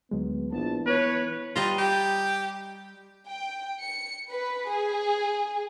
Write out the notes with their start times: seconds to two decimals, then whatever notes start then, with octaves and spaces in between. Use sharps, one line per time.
0.11 D2 F#3 G#3 B3
0.53 A#1 E3 B3 A5
0.86 B3 B4 C#5
1.56 G3 F4 D#5 A#5
1.78 G4
3.28 G5
3.81 C#7
4.29 B4
4.69 G#4